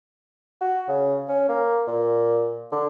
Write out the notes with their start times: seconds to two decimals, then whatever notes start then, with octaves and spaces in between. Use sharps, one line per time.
0.61 F#4
0.88 C#3
1.28 C#4
1.49 A#3
1.87 A#2
2.72 D3